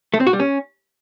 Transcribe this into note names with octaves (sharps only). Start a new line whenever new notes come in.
A3
C4
F#4
G3
C#4